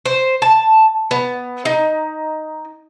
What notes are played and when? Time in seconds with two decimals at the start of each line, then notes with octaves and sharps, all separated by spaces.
0.06 C5
0.42 A5
1.11 B3
1.65 D#4